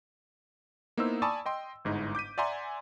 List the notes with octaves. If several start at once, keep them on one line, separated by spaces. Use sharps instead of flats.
A#3 B3 D#4 E4 C5 E6
D5 G#5 A5 B5 C#6 D#6
D#5 G5 C6
G1 G#2 D#4 E4
D6 G6 B6 D#7
D5 E5 F#5 G#5 A#5 C6